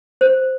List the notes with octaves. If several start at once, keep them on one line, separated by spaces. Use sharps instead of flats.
C5